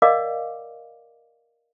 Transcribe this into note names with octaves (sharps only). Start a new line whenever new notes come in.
A#4 D5 D#5 F5 F#5 D6